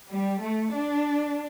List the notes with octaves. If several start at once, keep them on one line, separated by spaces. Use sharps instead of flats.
G3
A3
D4